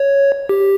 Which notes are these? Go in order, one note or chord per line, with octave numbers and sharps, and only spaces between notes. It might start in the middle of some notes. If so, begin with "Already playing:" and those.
Already playing: C#5
G4